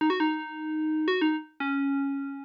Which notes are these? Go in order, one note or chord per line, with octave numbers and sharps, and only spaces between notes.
D#4
F#4
D#4
F#4
D#4
C#4